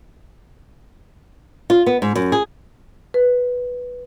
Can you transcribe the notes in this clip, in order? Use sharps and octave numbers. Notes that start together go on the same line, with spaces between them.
F4
B3
G#2
F#2
G#4
B4